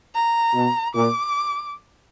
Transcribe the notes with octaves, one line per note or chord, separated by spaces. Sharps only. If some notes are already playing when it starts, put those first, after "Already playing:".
A#5
B2
A#2 D6